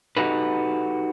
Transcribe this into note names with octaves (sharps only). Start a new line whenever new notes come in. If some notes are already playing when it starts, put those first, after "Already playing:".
D#4 F#4 G4 A4 B4